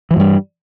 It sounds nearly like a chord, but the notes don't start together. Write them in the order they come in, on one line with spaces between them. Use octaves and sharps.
E3 F#3 G2 G3